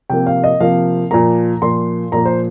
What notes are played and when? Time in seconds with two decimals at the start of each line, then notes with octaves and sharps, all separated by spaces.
0.10 C3 F3 A#3 G5
0.27 F5
0.44 D#5
0.61 C3 F3 A#3 F5
1.11 A#2 F3 A#3 A#5
1.62 A#2 F3 A#3 C6
2.12 A#2 F3 A#3 A#5
2.25 C5